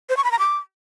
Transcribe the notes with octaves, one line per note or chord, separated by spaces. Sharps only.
C5
C#6
B5
A#5
D6